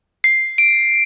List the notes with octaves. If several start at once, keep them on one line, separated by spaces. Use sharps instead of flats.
C7
D7